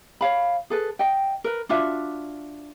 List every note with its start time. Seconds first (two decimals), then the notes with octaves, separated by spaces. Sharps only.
0.21 C#5 F5 B5
0.70 G#4 A4 B4
0.99 D#5 G5
1.44 A#4 B4
1.69 D4 F4 F#4 E5